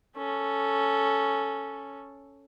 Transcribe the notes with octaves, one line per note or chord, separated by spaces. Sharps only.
C#4 A4